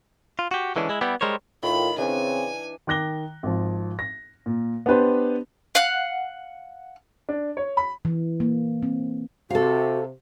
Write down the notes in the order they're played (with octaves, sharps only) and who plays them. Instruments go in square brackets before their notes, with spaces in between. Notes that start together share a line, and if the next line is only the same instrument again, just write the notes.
[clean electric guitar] F4
F#4 G4
D3 E3 G#3 C#4 D4
G#3 E4
G3 B3 E4 G4
G3 G#3 A#4 C5 C#5
[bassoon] A2 [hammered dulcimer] D#3 [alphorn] F4 [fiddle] B5
[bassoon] C#3 [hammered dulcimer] E3 D4 [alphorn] C4 [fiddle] G#5
[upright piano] D#3 D6 F#6 A#6 G7
G#1 F3
A#6
A#2
B3 D4 G4 B4 C5
[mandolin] F5 F#5 F#6
[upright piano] D4
C#5
B5
[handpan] E3
A#3
C4
[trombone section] C3 [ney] F#4 [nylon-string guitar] A4 F5